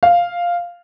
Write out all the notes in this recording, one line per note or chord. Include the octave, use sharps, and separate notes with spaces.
F5